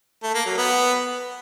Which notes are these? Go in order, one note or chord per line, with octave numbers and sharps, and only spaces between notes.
A3
A#3
F#3
B3